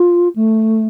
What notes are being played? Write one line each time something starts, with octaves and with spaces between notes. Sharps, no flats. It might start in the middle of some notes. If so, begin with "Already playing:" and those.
Already playing: F4
A3